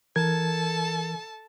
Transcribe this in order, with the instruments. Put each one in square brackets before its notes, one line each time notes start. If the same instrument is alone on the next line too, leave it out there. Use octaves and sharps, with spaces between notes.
[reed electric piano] E3 A#4 G#6 [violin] A4 A5